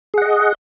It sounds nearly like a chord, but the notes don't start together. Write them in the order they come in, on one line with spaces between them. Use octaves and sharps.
G#4 F#5 D#5